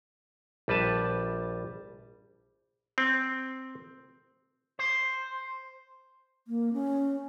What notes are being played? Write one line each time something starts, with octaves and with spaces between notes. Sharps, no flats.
A#1 G3 B4 A5
C4
C5
A#3
C#4